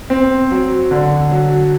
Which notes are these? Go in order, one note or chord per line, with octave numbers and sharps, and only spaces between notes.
C4
F#3
D3
F#3